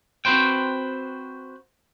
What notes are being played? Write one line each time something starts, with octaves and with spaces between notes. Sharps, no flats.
C4 F#4 B4 C5 G5